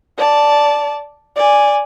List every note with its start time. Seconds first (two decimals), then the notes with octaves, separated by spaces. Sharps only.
0.18 D5 A5
1.36 D5 G#5